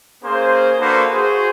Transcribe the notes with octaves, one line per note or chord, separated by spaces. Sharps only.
A#3 C#4 G#4 C5
A#3 D4 F#4 A4 B4 C5
F#4 G#4 C5